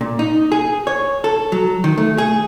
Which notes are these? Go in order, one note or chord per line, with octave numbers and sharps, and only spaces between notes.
A#2
D#4
G#4
C#5
A4
F#3
D#3
A3
G#4